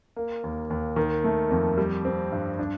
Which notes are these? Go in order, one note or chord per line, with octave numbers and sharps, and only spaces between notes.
A#3
D#2
D#2
D#3
A3
F2
G3
C4
G2
D4